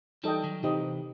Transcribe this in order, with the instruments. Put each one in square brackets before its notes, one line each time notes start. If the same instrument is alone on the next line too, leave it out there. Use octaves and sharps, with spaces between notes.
[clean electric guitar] E3 G3 [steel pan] D#4 A4 D#5 G5
[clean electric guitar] D#3 F#3
[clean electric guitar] C3 E3 [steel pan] D#4 G4 C5 D#5